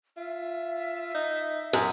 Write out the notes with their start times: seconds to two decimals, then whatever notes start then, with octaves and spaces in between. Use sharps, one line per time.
0.17 F4 E5
1.14 D#4
1.73 F#2 D#6